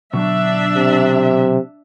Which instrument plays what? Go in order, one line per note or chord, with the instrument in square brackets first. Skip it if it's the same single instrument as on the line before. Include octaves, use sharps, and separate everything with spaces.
[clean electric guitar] B2 D3 F#3 [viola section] D4 E5
[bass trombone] C3